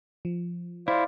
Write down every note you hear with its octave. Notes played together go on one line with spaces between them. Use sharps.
F3
E4 C5 D5 F5